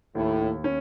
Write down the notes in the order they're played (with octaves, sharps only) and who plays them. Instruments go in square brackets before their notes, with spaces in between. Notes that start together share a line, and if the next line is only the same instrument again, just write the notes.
[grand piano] D#2 [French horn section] A2
[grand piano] D#2
C#4